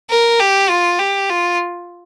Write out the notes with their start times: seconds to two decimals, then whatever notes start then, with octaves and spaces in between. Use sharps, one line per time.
0.10 A#4
0.40 G4
0.70 F4
0.99 G4
1.29 F4